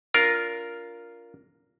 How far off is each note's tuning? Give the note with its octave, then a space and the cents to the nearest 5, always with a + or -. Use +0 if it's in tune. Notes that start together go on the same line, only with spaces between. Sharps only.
D4 -40 F4 +0 A#4 +0